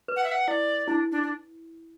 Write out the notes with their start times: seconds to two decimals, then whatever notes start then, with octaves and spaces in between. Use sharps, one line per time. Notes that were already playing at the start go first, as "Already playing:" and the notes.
0.08 B4
0.16 F#5
0.24 E5
0.32 F#5
0.48 E4 D5
0.88 D4 E4
1.12 D4
1.23 D4